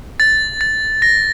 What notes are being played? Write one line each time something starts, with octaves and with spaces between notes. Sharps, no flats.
A6
A6
A#6